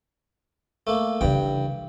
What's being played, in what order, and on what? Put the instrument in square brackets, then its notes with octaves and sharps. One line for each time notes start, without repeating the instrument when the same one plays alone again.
[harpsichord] A3 A#3
[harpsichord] G2 G5 [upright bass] C#3 E3